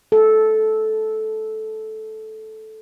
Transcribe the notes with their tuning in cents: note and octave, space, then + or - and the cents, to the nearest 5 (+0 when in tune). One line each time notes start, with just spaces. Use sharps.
A4 -10